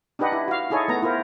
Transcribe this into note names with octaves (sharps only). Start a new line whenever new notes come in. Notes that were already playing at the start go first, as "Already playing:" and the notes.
D4 D#4 G4 B4 D#5 F#5
E4
F#4 F5
D#4 E4 G#4 A4 C#5 D#5
A3 B3 A#5
E4 F4 A#4 C5